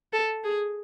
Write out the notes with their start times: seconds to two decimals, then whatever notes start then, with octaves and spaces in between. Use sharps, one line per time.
0.13 A4
0.44 G#4